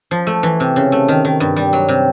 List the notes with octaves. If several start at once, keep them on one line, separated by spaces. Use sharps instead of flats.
F3
A3
E3
C3
C#3
A3
D#3
D#3
G2
G3
F#3
C3